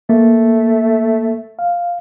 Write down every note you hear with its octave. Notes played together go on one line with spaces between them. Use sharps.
A3 A#3
F5